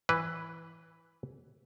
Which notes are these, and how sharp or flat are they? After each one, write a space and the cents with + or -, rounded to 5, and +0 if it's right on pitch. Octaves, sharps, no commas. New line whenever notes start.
E3 +0 B4 +0